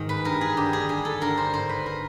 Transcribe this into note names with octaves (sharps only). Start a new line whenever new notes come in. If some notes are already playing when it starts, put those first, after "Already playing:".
Already playing: G#2 D#3
B4
G2 A#4
G#4
D3 G4
G#4
G2 G#4
A4
D3 A#4
C5
G#2 C5
B4
A#4